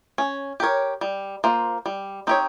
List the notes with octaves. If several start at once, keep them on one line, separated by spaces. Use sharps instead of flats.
C#4
G4 A#4 C#5
G3
A#3 F4 C5
G3
C4 D#4 G4 C#5